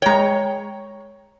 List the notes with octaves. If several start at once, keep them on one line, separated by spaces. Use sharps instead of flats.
G#3 C#5 G5 A#5